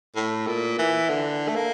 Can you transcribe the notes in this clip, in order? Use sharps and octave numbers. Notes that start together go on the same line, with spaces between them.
A2
A#2
E3
D3
A3
A#3